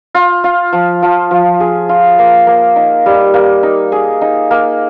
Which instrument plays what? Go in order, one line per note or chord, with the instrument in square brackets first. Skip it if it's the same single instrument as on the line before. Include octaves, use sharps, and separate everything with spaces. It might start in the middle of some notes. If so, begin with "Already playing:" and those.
[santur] F4
F4
F3
F3
F3
G#4
F4
A#3
A#3
D#4
G3
A#3
D#4
G#4
D#4
A#3